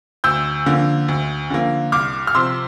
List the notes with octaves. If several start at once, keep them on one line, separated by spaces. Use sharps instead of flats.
D2 E6 G6
D3 F3 A#3
D2
D3 F3 A#3
C2 D6 F6
F6
C3 F3 C6 E6